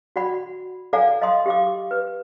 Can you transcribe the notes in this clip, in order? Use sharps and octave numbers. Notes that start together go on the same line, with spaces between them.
F#4 D5 F#5 B5
A4 D5 F5 F#5 G#5 A#5
D#5 F5 A#5 C6 D#6
G4 F5 D6
B4